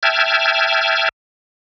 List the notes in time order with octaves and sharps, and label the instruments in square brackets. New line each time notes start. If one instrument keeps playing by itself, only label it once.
[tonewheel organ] E5 G5 A5 F6 G#6